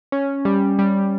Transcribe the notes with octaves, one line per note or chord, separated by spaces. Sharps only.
C#4
G3
G3